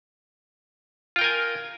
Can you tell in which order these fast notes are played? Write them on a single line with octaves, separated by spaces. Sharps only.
F4 G5 A#4 G#5